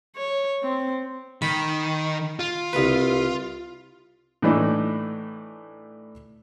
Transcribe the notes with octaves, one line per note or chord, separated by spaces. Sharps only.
C#5
C4
D#3 B5
F4
C2 B4
A2 E3 A3 D4 D#4